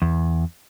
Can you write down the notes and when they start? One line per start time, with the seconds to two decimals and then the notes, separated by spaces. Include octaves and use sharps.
0.02 E2